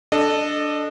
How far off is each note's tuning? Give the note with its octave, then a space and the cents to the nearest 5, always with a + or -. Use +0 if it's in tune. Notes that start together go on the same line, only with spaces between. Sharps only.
D4 +0 A4 -5 D#5 -25